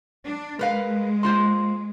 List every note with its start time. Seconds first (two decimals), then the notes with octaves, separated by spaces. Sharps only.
0.24 D4
0.59 G#3 A#4 B4 F5
1.23 A#3 F4 C5 C6